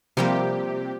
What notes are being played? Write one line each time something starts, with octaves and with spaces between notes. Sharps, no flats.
C3 F3 G3 A#3 G4